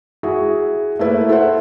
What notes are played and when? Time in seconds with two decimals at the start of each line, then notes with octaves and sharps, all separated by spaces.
0.23 E4 F#4 G#4
0.99 A3 A#3 E4 B4
1.29 E4 A4 C5 E5 F#5